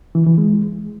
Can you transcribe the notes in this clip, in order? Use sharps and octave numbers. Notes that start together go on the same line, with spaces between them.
E3
E3
G#3